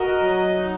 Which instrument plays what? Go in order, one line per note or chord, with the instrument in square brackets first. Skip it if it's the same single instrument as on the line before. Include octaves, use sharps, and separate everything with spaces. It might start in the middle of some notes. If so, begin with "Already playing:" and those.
Already playing: [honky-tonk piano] F#4 [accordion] A#4 D#5
[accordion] F#3
D#4